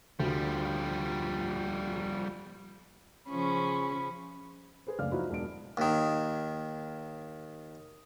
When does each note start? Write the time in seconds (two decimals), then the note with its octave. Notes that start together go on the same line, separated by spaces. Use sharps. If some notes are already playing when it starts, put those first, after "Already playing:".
0.20 D2 F3 G3
3.29 C#3 F3 C#4 B5 C#6
4.87 G#4 B4 C5
4.99 F#1 D2 C#3 D5 F5 F6
5.12 F3 F#3 D#4 E4 F#4 C5
5.30 E1 D4 D7
5.77 D#2 D#3